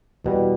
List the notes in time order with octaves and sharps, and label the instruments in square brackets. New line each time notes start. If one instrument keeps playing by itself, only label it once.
[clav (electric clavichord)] E2 B2 G3